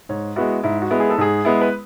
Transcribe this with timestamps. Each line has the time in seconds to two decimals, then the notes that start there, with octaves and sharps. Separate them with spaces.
0.09 G#2 C#5
0.36 G#3 B3 E4 F#4
0.63 G#2 E4
0.82 F#4
0.90 G#3 B3 E4
1.00 G#4
1.10 A4
1.18 G#2 G#4
1.45 G#3 B3 E4
1.61 B4